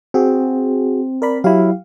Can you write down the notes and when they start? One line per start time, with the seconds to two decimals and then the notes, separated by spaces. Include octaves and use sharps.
0.14 C4 F#4 G#4
1.22 A#4 D5 B5
1.44 F#3 E4 G4 F5